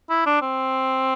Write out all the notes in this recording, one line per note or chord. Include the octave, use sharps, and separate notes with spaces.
E4
D4
C4